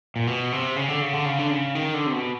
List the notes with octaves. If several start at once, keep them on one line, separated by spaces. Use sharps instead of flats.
A#2
B2
C3
C#3
D3
C#3
D3
C#3
D3
C#3
D#3
D3
C3
B2